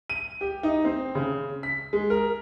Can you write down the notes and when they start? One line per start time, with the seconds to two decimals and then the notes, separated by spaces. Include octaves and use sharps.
0.10 D#7
0.41 G4
0.63 D#4
0.85 C4
1.15 C#3
1.63 B6
1.93 G#3
2.10 A#4